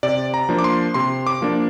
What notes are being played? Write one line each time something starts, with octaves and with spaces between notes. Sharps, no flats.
C3 D5
A#5
F3 A#3 D4
D6
C6
C3 C6
D6
F3 A#3 D4